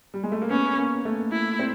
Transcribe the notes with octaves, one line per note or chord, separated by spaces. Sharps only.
G3
G#3
A3
A#3
B3 C#4
A#3
A3
E4
C4